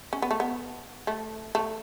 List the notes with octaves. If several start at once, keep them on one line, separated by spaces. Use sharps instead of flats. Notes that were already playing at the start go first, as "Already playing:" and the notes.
C#4
B3
A3
B3
A3
A3